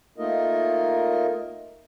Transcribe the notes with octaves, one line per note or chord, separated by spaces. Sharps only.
A3 A#3 D#4 F4 A#4 D#5